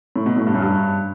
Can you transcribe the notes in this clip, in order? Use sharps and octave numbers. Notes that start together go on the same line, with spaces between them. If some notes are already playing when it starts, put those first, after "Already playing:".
A2
B2
A2
G2
F#2
G2